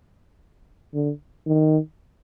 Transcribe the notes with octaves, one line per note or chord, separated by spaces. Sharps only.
D3
D#3